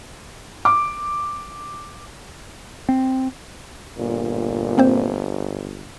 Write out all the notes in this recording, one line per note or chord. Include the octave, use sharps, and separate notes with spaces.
D6
C4
G1 A#2
A#3 C4 C5